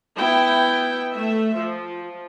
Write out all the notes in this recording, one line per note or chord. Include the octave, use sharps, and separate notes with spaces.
B3 E4 G5
A3 E5
F3